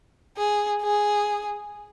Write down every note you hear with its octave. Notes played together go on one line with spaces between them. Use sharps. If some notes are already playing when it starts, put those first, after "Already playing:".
G#4
G#4